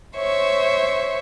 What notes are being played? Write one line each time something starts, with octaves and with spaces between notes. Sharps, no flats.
C5 C#5 E5 C#6